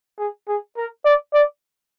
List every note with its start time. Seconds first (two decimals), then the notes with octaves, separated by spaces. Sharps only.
0.19 G#4
0.48 G#4
0.77 A#4
1.05 D5
1.34 D5